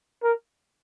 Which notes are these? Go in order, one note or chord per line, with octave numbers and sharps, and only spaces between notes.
A#4